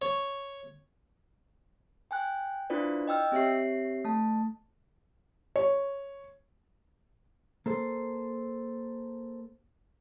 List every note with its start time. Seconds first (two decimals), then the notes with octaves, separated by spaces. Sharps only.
0.02 C#5
2.11 G5 G#5 F#6
2.70 D4 E4 F4 B4 C5 D5
3.08 D#5 G5 E6 F6
3.32 C4 G4 C#5 E5 C7
4.04 A3 A5
5.56 C#5
7.66 A#3 A4 C5